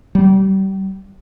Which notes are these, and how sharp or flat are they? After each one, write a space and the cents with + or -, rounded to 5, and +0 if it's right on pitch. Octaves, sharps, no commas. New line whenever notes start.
G3 -30